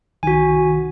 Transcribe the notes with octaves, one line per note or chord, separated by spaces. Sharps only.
C2 D#3 F#4 G#5